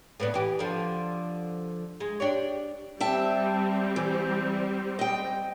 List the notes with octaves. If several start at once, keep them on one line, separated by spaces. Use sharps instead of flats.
A2 B3 D4
E3 G4
D3 F3
G#3
D4 G4 C#5
G3 C4 E5 G5 A5
E3
D#5 G5